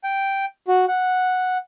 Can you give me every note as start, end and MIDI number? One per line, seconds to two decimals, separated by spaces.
0.04 0.45 79
0.68 0.85 66
0.88 1.58 78